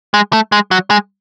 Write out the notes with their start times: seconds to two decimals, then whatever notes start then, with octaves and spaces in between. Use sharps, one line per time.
0.14 G#3
0.33 A3
0.52 G#3
0.71 F#3
0.90 G#3